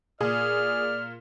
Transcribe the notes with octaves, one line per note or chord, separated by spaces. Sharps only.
A#2 G#4 D5 F6